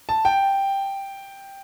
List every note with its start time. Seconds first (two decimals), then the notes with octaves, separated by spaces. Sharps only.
0.09 A5
0.25 G5